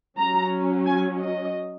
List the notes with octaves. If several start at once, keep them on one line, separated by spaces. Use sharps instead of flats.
F#3 C#4 A#5
G#5
D#5